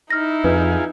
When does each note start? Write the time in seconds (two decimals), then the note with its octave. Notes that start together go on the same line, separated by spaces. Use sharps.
0.10 D#4 E4 F6 A#6
0.44 F2 F4 G#4 B4